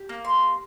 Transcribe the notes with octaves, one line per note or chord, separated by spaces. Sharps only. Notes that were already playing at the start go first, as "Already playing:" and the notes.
Already playing: G4
A#3
C6